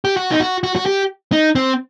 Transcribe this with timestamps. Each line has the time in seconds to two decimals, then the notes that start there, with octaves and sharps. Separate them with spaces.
0.05 G4
0.17 F#4
0.31 D#4
0.40 F#4
0.63 F#4
0.76 F#4
0.86 G4
1.32 D#4
1.55 C4